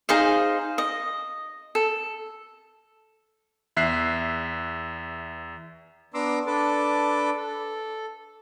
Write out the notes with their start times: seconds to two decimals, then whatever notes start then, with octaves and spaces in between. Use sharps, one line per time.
0.09 D#4 G#4 C5 F5
0.78 D#5
1.75 A4
3.77 E2 E5 F#6 C7
6.14 B3 D4 A#5 C6 D6 E6
6.47 D4 A4 B4 A5 D6
7.36 A4